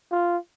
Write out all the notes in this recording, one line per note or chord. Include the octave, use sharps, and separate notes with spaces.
F4